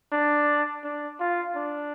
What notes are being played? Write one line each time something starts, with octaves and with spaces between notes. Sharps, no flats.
D4
D4
F4
D4